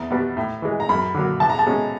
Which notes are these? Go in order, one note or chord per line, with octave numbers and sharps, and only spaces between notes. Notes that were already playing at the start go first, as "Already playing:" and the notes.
Already playing: E2 A#5
B2 G3 B3
A2
E3 G#3
A#5
F#2 B5
D3 F#3 A#3
C2 A5
A#5
A5
B2 G#3 C#4